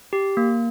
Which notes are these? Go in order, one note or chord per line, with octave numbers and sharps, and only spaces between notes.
G4
A#3